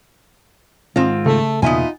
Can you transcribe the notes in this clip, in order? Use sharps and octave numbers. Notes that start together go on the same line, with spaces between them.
G#2 D#3 G#3 C4 F4
C#3 A3
E2 B2 A#3 B3 D#4 F4 E5 G#5